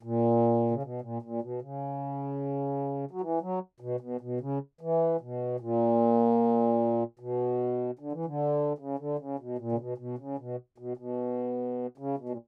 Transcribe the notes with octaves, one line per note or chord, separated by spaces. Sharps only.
A#2
C#3
B2
A#2
A#2
B2
C#3
F#3
E3
F#3
B2
B2
B2
C#3
E3
B2
A#2
B2
D3
E3
D3
C#3
D3
C#3
B2
A#2
C#3
B2
B2
C#3
B2
B2
B2
C#3
B2
A#2